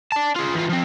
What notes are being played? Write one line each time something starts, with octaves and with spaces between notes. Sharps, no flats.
D5 A5
F4 G#4
E2 F4
F3 C4